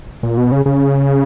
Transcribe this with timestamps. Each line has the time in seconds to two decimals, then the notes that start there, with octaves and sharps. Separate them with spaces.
0.23 A#2
0.37 B2
0.52 C#3
0.66 C#3